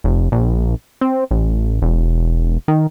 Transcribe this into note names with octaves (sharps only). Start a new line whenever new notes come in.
F1
A#1
C4
A1
E1
D#3